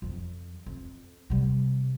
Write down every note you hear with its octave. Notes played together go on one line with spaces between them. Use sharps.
F2 F3
F2
C3 G3